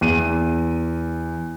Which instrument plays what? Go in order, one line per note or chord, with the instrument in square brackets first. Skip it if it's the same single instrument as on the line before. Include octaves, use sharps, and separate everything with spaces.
[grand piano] E2 D#7